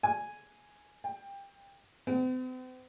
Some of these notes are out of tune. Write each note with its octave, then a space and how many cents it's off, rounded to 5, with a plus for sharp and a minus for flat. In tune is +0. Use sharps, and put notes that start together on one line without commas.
G#5 +0
G5 +20
C4 -45